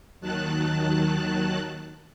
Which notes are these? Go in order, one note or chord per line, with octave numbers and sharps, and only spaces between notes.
D#2 D#3 F#3 A5 F#6